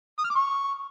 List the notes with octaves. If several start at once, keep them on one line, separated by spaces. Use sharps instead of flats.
D#6
F6
D6
C#6